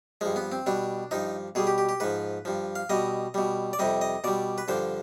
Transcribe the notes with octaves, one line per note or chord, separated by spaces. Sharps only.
G2 F3 G#3
B3
C4
B2 G3 D4
G2 F3 D#4
B2 G3 G#4
G4
G4
G4
G#2 F3 B4
G2 F3
F5
B2 G3 D#5
B2 G3
D5
F2 C3 G3 D#5
D#5
B2 G3 D5
B4
G2 D3 F3 C5